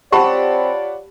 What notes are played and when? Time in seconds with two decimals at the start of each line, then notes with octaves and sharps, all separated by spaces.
0.12 C4 F4 G4 C#5 D5 F#5 A5 B5